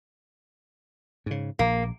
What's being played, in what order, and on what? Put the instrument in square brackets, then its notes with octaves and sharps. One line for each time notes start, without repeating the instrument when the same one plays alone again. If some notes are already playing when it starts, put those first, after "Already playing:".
[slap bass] G#2 C#3
[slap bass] A#1 [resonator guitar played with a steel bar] A#3